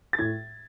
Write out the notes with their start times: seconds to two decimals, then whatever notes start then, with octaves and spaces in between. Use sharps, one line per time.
0.13 A6
0.19 A2 G#6